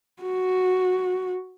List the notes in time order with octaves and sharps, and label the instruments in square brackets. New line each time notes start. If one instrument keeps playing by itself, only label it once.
[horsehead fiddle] F#4